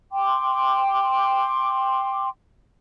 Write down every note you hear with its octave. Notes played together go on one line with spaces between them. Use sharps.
G5 C6 D6